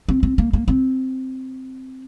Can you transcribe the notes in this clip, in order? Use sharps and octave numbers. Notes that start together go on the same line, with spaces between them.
C4
C4
A#3
A#3
C4